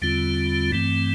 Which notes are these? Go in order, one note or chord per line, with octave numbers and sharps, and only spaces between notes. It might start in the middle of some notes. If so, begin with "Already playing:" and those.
E2 D3 G3 C4 F4
G2 E3 A3 C4